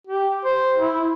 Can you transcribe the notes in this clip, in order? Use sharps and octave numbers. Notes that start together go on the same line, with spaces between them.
G4
C5
E4